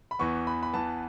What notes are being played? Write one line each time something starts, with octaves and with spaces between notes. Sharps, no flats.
B5
E2 E3 B3 C#6
B5
B5
E2 E3 B3 A5